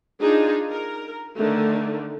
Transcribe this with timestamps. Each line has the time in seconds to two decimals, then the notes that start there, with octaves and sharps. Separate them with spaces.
0.20 D4 D#4 F4 G#4
0.69 A#4
1.36 D3 D#3 A3